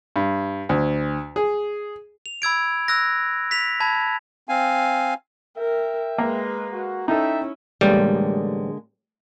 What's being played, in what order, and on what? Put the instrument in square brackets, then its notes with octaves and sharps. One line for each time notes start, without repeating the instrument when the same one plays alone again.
[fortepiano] G2
D2
G#4
[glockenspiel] F7
B5 E6 G#6 D7
E6 F#6 A#6
B6 F7
A5 B5 G#6
[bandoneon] C4 F5 G#5
[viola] A#4 [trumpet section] E5 G5
[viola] G#3 B4 [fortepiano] A#3
[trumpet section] F#4
[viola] C#4 E4 [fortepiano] D#4 A4 [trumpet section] E5 G5
[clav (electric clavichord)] A1 G3 [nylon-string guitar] D3 G#3 A#3